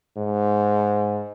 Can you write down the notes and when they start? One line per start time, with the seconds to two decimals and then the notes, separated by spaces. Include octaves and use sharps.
0.17 G#2